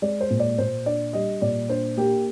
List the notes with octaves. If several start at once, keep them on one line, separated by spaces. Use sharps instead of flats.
G#3 D5
C5
A#2
D5
A#2 C5
D4 D5
G3 D#5
A#2 D5
D4 C5
A#3 G4